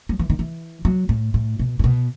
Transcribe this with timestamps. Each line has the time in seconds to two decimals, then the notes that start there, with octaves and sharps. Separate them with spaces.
0.09 F#3
0.19 E3
0.30 D#3
0.39 E3
0.85 F#3
1.09 A2
1.34 A2
1.59 B2
1.79 A2
1.84 B2